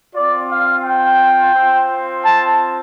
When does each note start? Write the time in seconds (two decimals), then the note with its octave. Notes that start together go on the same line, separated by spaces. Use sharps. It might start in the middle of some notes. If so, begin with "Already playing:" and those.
0.15 C4 F4 D5
0.50 F5
0.84 G5
1.55 C4 F4
2.24 A5